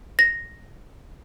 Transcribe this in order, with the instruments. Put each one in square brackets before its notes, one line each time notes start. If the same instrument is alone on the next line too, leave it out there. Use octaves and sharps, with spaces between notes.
[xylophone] A#6